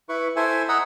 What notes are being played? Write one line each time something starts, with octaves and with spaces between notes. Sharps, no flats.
E4 B4 C#6
E4 A4 C5 E5 G#5
D#5 F#5 A#5 D#6 E6